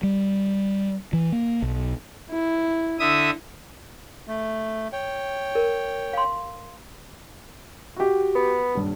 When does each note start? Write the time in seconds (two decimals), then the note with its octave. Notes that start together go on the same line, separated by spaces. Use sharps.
0.03 G3
1.13 E3
1.32 A#3
1.62 B1
2.30 E4
2.99 D3 E5 D#6
4.27 A3
4.93 C#5 G5
5.55 A#4
6.13 F5 C6
7.96 F#4 G4
8.35 B3
8.75 D#1 G2